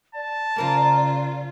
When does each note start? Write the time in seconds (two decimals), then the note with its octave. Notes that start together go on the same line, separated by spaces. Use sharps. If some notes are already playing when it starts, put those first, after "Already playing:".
0.15 D5 A5
0.56 C#3 A#3 F4 A#4 C5